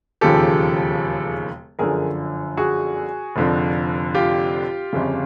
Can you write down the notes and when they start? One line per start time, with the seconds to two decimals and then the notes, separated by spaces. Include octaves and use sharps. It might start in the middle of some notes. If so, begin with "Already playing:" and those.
0.21 E1 D#2 C#3 F3 G4 A4
1.79 G1 F#2 D3 F3 G#4 A#4
2.57 F#4 G#4
3.36 F1 F2 D3 F3
4.15 F4 G4
4.93 G1 F2 C#3